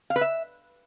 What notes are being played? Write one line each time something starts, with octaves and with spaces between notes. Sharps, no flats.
F5
B4
E5